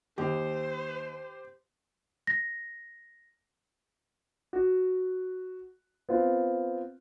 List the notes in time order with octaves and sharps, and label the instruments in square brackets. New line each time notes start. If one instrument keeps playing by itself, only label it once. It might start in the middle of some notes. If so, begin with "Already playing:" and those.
[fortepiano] D#2 [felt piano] G4 [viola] C5
[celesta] A#6
[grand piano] F#4
B3 C4 F4